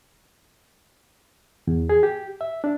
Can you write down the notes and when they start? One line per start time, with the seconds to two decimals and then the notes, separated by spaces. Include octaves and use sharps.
1.67 E2
1.89 G#4
2.03 G4
2.41 E5
2.64 D4